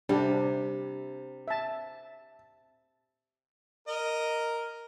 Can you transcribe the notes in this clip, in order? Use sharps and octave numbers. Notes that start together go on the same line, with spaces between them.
C3 G3 D4
E5 A5
A#4 D#5